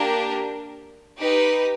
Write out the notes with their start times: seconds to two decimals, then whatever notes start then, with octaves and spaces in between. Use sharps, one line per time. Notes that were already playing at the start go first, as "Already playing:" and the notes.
Already playing: A#3 D4 G4 A#4
1.17 D#4 G4 B4